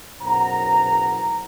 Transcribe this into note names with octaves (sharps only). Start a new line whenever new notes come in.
F#1 B1 A#4 C5 F#5 A#5